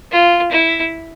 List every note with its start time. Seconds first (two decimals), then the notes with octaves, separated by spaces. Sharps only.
0.12 F4
0.52 E4